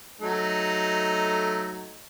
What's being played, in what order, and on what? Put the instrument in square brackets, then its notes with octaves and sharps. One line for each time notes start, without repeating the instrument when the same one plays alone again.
[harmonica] F#3 A3 D#4